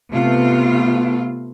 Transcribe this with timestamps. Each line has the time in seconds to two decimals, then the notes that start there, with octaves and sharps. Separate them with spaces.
0.12 C3 A3 B3 F4